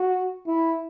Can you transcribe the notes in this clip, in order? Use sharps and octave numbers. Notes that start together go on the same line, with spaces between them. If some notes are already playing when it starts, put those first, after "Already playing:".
Already playing: F#4
E4